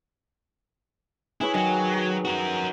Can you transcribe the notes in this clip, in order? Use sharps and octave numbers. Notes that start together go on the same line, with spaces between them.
E4 G#4 B4 C#5
D#3 F#3
F#4 A#4